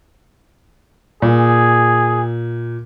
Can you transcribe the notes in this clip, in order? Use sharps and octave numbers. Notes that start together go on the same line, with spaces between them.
A#2 G#4